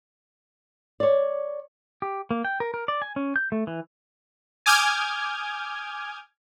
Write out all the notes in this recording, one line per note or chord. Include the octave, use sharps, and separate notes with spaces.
C#5 D5
G4
A#3
G5
A#4
A#4
D5
G#5
C#4
G6
A3
E3
G#5 D6 D#6 F6 G6 G#6